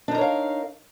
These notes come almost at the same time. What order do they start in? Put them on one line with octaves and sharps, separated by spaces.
D4 D#4 A#4 C#5 F5